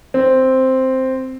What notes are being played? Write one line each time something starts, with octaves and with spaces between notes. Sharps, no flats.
C4